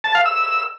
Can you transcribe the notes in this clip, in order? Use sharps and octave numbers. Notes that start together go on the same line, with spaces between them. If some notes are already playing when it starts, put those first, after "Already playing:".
A5
F5
E6